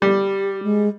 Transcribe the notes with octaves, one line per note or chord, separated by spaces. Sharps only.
G3 G4
G#3